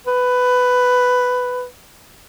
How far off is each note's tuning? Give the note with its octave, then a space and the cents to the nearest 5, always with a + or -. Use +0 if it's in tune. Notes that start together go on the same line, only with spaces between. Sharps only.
B4 +10